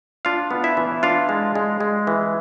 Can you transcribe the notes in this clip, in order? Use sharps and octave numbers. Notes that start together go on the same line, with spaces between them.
D4 F4 F5
B3
E4 E5
E3
D4 F4 F5
G#3
G#3
G#3
E3